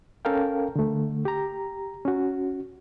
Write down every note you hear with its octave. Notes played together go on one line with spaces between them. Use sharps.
C#4 A4 A#4 F5 G5
D3 A3
G4 A#5
C#4 F#4